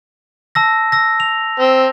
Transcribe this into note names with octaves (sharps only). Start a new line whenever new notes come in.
A5 E6 A#6
E6 A#6
F7
C4